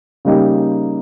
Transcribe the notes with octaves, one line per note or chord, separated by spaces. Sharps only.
C#3 G3 A#3 D#4 G4